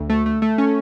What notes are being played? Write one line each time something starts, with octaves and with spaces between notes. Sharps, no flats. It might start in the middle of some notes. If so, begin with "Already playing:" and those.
Already playing: D2
A3
A3
A3
C#4